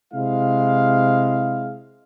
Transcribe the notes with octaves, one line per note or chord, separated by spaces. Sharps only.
C3 G#3 E4 F5